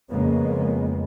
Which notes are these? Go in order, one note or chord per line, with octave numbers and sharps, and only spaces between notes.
F2 C#3 F3 G#3 A#3 B3